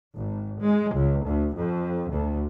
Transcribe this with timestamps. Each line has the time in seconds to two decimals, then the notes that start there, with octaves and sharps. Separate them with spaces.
0.16 G#1
0.61 G#3
0.96 C#2
1.27 D2
1.58 F2
2.14 D2